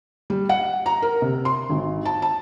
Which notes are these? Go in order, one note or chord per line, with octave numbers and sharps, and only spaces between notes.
G3
F#5
A#5
A#4
C3
C6
G#1
A5
A5